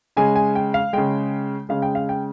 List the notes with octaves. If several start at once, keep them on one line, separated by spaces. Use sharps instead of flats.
C#3 G#3 G#5
G#5
G5
F5
C#3 G#3 G5
C#3 G#3 F5
G5
F5
G5